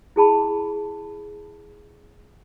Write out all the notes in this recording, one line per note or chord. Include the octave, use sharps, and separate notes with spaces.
E4 G#4 A5 B5